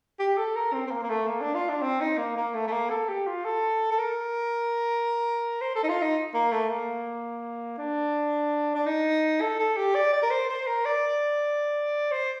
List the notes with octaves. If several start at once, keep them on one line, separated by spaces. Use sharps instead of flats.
G4
A4
A#4
C4
C4
A#3
A#3
A3
A#3
D4
F4
D4
C4
D#4
A#3
A#3
A3
A3
A#3
A4
G4
F4
A4
A4
A#4
C5
A4
D#4
F4
D#4
A#3
A3
A#3
D4
D4
D#4
A4
A4
G4
D5
D5
A#4
C5
C5
A#4
D5
C5